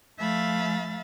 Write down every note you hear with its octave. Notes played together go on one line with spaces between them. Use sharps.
F3 A3 E5 F5 B5 A6